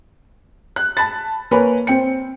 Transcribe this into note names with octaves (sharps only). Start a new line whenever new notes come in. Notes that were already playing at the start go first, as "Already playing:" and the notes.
F#6
A5 B5 A6
A#3 A#4 B4 C#5 G#5 B5
C4 G5 C#7